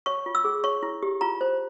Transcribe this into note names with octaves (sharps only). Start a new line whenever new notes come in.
C#5 C#6
F4
E6
G#4
C#5 C#6
E4
G4
F4 A#5
C5